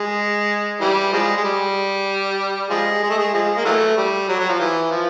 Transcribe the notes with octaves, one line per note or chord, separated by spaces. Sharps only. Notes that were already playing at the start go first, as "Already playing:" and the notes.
Already playing: G#3
E3 G3
F3 G#3
G#3
G3
F3 G#3
G#3
A3
G#3
F3 G#3
A#3
E3 F#3 A3
G3
F#3
F#3
F3
E3
F3